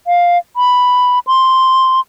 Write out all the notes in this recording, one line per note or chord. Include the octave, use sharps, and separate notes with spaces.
F5
B5
C6